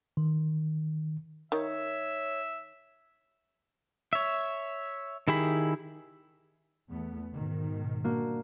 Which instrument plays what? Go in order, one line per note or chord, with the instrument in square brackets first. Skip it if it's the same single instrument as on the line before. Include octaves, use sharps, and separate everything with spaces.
[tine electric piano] D#3
[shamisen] D#3 [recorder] C#5 [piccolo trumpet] E5
[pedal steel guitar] C#5 E5
D#3 E4 G4 G#4 B5
[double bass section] E2 A3 B3
G#2 B2 D#3
[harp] A#3 D4 F#4